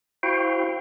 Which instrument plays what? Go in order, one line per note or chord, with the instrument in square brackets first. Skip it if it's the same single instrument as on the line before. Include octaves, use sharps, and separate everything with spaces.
[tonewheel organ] E4 F#4 C5 F5 G5